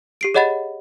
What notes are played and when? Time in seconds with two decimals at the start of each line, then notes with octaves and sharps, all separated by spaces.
0.21 G4 C7 D7
0.34 G#4 C#5 D#5 F#5 B5 A6